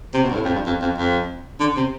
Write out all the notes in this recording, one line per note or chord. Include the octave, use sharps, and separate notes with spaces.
C3
B2
G2
A2
F2
G2
F2
F2
F2
D3
C3